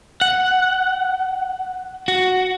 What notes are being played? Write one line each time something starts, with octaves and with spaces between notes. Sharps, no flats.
F#5
F#4